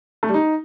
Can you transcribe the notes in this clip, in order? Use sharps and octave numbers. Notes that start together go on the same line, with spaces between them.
A3
G3
D#4